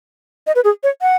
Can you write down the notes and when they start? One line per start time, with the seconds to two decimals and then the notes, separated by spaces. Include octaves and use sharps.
0.47 D#5
0.56 B4
0.64 G#4
0.83 C#5
1.02 F#5